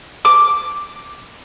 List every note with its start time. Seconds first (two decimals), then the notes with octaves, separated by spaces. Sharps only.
0.25 D6